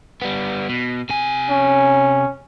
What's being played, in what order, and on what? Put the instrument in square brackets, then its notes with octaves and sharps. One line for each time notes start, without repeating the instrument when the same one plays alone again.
[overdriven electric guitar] G3 B3
B2
C3 G#5
[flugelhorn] C#4